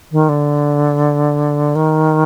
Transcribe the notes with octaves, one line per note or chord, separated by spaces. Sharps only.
D#3
D3
D#3